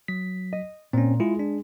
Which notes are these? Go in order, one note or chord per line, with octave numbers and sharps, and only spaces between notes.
F#3 B6
D#5
A#2 C4 C#4
G#3 E4 F4 G#4
D4